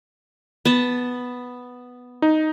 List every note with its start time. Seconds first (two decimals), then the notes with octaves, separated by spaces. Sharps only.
0.65 B3 A5
2.22 D#4